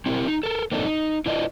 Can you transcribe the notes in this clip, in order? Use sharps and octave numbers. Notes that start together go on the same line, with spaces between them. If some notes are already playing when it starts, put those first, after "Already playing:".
C4 E4 G4 A#4
D#4
A4 A#4
A#3 C4 D4 D#4 F#4 A4
D#4
E4 F4 B4 D5 D#5